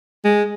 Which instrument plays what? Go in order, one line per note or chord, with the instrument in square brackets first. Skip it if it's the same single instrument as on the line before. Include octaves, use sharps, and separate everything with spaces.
[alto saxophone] G#3